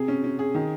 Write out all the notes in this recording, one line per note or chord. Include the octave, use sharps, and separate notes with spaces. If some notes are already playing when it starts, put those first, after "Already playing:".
Already playing: C3 G#4
C#4
C#4
G#4
D#3